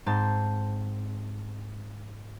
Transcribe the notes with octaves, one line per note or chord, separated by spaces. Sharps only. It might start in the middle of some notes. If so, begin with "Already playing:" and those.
G#2 C4 A5 C6 G6 A6